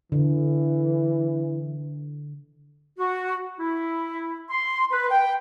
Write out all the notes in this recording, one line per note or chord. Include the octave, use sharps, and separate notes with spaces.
D3 E3
F#4
E4
C6
B4
G5